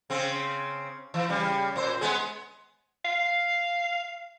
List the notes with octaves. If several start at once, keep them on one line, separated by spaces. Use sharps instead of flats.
C#3 C4
E3
C#3 G3
A#2 C5
G#3 B3 G#4
F5